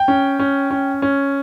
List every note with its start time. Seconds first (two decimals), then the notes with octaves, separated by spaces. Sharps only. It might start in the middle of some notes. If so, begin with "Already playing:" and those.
Already playing: G5
0.08 C#4
0.39 C#4
0.71 C#4
1.02 C#4